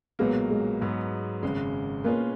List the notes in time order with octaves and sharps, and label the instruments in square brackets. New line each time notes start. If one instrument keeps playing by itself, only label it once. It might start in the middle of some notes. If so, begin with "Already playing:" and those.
[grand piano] B1 A#2 F#3 A#3 [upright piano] G#3 B3
[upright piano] G#3
[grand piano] G#2 F#3 B3
G#1 F#2 C#3 G#3
[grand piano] B2 G#3 C#4 F4 B4 [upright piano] A#3